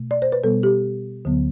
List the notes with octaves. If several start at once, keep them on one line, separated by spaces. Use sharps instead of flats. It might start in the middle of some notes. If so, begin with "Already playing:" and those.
Already playing: B2 A3
D5
C5
B4
B2 G3 B3 A4
G4
D2 D3 F#3 B3